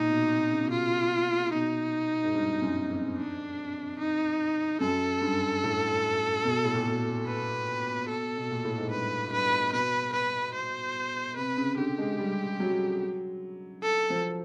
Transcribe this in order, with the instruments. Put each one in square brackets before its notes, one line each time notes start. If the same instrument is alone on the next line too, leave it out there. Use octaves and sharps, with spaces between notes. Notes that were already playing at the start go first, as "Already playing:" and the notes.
Already playing: [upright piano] A#2 [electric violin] D#4
[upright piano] B2
C3
C#3
B2
[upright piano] C3 [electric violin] F4
[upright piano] B2 [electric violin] D#4
[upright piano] G#2
G2
F#2
F2
[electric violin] D4
D#4
[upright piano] F#2 [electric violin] A4
[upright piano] G2
A2
B2
A2
A#2
B2
[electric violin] B4
A4
[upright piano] B2
A#2
A2
G#2
[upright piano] G2 [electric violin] B4
[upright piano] G2 [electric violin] B4
[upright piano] B2 [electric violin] B4
[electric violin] B4
C5
[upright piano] C3 [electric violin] B4
[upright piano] C#3
[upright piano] D3 [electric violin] G4
[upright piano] G#3
G3
F#3
[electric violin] A4
[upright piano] F3